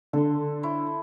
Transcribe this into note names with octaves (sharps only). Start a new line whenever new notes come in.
D3 A4 C6
E4 C5 C#5